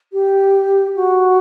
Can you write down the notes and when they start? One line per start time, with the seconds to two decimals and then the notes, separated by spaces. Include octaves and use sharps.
0.13 G4
0.95 F#4